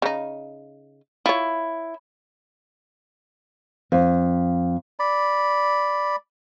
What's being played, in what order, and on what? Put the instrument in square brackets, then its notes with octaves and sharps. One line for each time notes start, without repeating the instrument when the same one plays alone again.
[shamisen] C#3 D#4
[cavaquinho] E4 [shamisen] F4 C#5
[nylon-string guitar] F2
[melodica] D5 B5